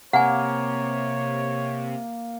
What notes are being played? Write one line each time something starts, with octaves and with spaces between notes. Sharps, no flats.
C3 A#3 C#5 F#5 G#5